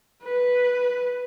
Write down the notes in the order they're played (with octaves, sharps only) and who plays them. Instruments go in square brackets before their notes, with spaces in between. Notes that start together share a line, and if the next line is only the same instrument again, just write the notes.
[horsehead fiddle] B4